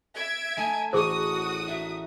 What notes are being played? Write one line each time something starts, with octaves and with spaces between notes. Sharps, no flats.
E5 G#6 D7
A3 D#4 G#5 A5
A1 F#4 G#4 C5 C#6 D#6
D#4 E5